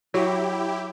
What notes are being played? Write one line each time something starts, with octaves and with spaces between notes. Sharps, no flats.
F#3 E4 G4